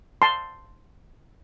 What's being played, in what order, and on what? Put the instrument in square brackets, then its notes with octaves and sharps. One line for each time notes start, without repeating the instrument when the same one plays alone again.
[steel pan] A5 C6